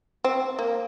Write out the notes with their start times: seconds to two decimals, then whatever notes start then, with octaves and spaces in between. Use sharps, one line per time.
0.24 C4
0.59 A#3